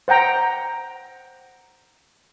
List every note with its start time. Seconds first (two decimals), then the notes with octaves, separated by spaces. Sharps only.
0.08 C5 F#5 G5 A#5